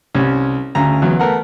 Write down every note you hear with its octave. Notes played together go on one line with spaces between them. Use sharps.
C2 C#4
D2 C#3 A#5
E2 F#3
A3 B3 A#4 F#5